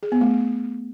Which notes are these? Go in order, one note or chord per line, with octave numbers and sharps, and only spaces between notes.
G#4
B3
A3